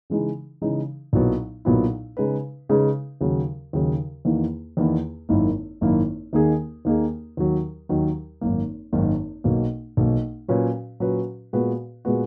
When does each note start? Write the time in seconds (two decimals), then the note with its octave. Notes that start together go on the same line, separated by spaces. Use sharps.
0.10 C#3 E3 G#3 D#4
0.62 C#3 E3 G#3 D#4
1.13 B1 A#2 F#3 B3 E4
1.65 B1 A#2 F#3 B3 E4
2.17 C#3 G#3 D#4 G#4 B4
2.69 C#3 G#3 D#4 G#4 B4
3.21 D#2 C#3 F#3
3.73 D#2 C#3 F#3
4.25 E2 D#3 A#3 E4
4.77 E2 D#3 A#3 E4
5.29 G#1 F#2 D#3 A#3 E4
5.81 G#1 F#2 D#3 A#3 E4
6.33 D#2 D#3 A#3 D#4 G#4
6.85 D#2 D#3 A#3 D#4 G#4
7.37 D#2 D#3 F#3
7.89 D#2 D#3 F#3
8.41 G#1 F#2 D#3 A#3
8.93 G#1 F#2 D#3 A#3
9.44 B1 B2 A#3
9.97 B1 B2 A#3
10.48 A#2 F#3 C#4 F#4 B4
11.00 A#2 F#3 C#4 F#4 B4
11.53 A#2 G#3 B3 F#4 B4
12.05 A#2 G#3 B3 F#4 B4